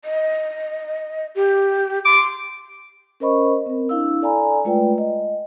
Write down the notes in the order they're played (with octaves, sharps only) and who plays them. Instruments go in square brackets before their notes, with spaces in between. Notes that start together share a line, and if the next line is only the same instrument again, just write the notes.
[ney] D#5
G4
[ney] C6 [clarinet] D6
[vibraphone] C#4 A#4 C5 D#5 B5 C#6
C4 A#4
D4 E4 F5 E6
A4 D5 F5 G#5 A#5 B5
G#3 A3 F4 B4 D5 G5
D#5